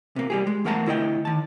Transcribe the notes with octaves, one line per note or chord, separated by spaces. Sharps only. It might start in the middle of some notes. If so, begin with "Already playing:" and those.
C3 A#3
G3 G4 G#4
G#3
E2 A3 A#4 F#5 A5 A#5
D2 E4 D#5 G5
D#3 A5